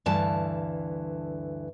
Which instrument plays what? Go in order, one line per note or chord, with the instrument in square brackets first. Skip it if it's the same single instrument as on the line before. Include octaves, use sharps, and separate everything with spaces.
[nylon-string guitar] D2 G2 E3 A5